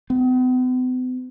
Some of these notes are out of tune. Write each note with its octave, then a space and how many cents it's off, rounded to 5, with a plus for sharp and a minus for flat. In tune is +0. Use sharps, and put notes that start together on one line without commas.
B3 +45